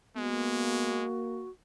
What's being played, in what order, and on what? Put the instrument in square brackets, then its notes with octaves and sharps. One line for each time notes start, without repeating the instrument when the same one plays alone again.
[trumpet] G#3 [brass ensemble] A#3 [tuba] B3 [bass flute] F#4